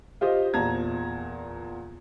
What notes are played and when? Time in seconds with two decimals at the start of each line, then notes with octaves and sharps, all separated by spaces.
0.21 F4 G4 C5 D#5
0.54 E2 A#2 A5 A#5 G#6